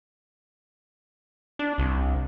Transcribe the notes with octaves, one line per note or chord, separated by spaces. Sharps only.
D4
C2